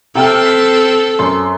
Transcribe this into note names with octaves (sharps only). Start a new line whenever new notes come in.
C3 C4 A4 G5 F6
B6
F#2 C6